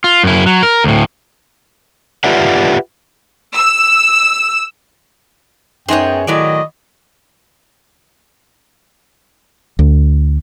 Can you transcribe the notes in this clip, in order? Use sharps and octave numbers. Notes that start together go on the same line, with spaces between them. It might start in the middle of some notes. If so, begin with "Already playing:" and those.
F4
F#2 E4
F#3
A#4
D2 A2
F4 G4 B4 D5 E5 F#5
E6
F#2 B3 D#4 G#4 C5 C#5 G5
A2 D#3 F#3 D5 D#5
D2